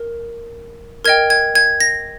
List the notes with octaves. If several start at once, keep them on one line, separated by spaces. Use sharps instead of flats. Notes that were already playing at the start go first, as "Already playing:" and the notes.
Already playing: A#4
A#4 D#5 G5 G#6
G#6
G#6
A#6